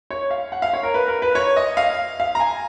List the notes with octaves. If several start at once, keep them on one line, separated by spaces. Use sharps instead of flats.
C#5
F5
F#5
F5
C#5
A#4
B4
A#4
B4
C#5
D#5
F5
F5
A#5
G#5